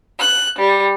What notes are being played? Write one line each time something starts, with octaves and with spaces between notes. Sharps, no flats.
F#6
G3